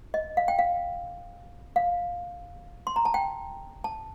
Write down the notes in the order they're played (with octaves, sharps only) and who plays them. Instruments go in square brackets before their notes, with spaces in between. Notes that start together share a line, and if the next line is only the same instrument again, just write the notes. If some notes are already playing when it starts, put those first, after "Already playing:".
[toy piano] D#5
F5
G5
F5
F5
C6
A#5
A5
G5
A5